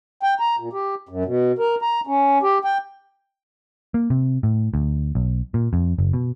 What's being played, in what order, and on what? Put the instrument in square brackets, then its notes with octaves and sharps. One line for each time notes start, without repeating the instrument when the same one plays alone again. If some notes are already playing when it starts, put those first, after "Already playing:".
[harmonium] G5
A#5
A#2
G4
F#2
B2
A#4
A#5
C#4
G4
G5
[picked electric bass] A#3
C3
A2
D2
B1
A#2
F2
F#1
B2